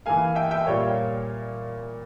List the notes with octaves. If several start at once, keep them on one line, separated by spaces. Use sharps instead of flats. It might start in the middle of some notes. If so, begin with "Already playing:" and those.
E3 A#3 F5 G#5
E5 G5
E5 G5
A#2 G3 A#3 C#5 F5